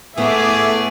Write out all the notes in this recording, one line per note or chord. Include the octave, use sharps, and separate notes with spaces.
A2 A3 B3 G#4 E5 D6